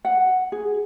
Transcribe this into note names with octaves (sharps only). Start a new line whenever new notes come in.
F#5
G#4